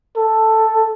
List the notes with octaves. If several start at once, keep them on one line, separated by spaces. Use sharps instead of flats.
A4